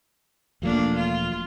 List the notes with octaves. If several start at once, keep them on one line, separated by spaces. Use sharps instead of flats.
E1 F3 A3 A#3 D4
F4